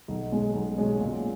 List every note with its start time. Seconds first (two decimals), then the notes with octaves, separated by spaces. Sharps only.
0.08 B1
0.31 B2 G#3 C#4
0.54 B1
0.78 B2 G#3 C#4
1.00 A#2